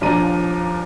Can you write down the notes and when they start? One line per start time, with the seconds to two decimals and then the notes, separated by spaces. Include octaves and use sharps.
0.01 D#2 A#2 F3 D4 A#5 D#7